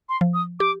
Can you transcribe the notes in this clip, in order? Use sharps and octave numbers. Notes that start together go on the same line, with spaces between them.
C6
F3
D#6
G4 D6